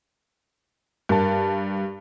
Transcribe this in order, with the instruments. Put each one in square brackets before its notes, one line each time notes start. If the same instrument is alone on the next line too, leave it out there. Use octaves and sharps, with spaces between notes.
[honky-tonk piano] G2 [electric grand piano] A#4 A5